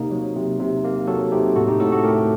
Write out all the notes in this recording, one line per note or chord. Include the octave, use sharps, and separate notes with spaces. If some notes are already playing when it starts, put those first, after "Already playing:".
Already playing: C3 A#3 D#4
F#3
C3
C3
A#3
F#3 F#4 A4
C3 D#4 G4
A2 F#4 A4
D#4 G4
A2 F#4 A4
F#4 A4
A3 G4 A#4